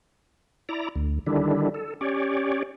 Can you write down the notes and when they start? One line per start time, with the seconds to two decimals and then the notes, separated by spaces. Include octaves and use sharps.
0.69 E4 D5 A#5
0.95 D2
1.26 D3 D#3 G3 D4 E4
1.74 A4
2.01 C#4 G4 C#5 D5